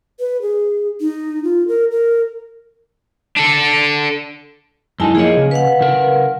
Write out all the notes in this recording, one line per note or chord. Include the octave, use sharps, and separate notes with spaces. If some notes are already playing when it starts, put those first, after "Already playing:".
B4
G#4
D#4
F4
A#4
A#4
D4 A4
F#2 G#3 D#4 E4 G#5 A5
F3 A#3 G#4 C#5 D#5
C#3
B4 F5 F#5
C#3 A#4